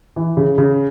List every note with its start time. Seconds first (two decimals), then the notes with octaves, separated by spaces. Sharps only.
0.16 E3
0.37 C#3
0.58 C#3